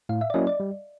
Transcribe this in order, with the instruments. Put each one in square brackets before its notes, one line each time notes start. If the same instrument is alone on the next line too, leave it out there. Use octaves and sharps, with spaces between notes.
[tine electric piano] A2 [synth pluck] F5
[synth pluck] E5
D5
[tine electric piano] F#3 A#3 C#4 E4 [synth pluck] D#5
[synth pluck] D5
[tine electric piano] G3